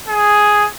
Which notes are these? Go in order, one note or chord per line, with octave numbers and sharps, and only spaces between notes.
G#4